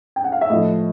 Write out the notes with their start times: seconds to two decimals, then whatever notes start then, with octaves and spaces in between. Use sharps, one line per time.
0.16 G5
0.24 F#5
0.32 F5
0.41 E5
0.49 A2 F3 D#5